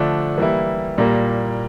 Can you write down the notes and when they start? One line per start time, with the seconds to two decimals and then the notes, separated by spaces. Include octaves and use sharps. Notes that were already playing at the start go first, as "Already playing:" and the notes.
Already playing: D3 F3 A3 D4
0.38 E3 G3 A#3 E4
0.98 A#2 G3 A#3